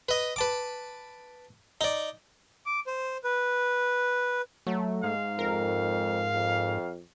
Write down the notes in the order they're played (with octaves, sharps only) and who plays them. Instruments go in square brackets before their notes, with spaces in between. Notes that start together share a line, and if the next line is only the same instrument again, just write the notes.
[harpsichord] B4 D#5
B4 A5 D6
D#4 D5
[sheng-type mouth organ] D6
C5
B4
[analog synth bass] F#3 [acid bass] A3
[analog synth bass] G#2 [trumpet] F5
[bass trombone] F2 [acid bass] A#4
[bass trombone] F2